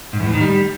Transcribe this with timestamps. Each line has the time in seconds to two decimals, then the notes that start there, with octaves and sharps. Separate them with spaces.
0.13 G#2
0.20 E2
0.27 A2
0.33 D#3
0.40 G3